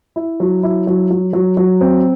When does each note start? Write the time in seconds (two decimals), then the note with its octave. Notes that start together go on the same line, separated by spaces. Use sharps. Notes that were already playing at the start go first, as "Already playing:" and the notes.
0.16 E4
0.40 F#3
0.63 E4
0.87 F#3
1.11 F#3
1.33 F#3
1.57 F#3
1.81 C4